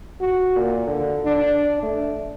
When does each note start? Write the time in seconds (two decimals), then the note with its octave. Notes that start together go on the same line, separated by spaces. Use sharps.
0.20 F#4
0.56 A#2
0.87 D3
1.25 D4
1.83 A3